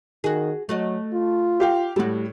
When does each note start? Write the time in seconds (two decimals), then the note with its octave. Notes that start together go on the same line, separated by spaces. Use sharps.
0.24 D#3 F#4 G#4
0.69 F#3 A3 F#4 D#5
1.14 F4
1.60 G4 F5 G5
1.96 A2 G3 F#4 A4